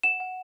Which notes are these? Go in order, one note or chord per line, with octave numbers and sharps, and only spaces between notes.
F#5 E7
F#5